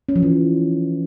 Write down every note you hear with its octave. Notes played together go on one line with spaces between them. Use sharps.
C#4
F3
E3